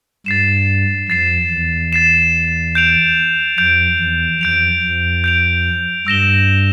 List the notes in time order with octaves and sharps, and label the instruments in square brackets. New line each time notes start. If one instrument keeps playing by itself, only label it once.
[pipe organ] G2 [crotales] A6 C7 E7
[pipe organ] F2 [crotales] A6 C7 E7
[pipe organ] E2
[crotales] A6 C7 E7
G6 D7 F7
[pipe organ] F2 [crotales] G6 D7 F7
[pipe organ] E2
[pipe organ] F2 [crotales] G6 D7 F7
[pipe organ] F2
[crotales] G6 D7 F7
[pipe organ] G2 [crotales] E6 A#6 E7 G7